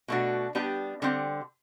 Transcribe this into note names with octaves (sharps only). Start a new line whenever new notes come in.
B2 A3 D4 F#4
G3 B3 D4 G4
D3 G3 C4 G4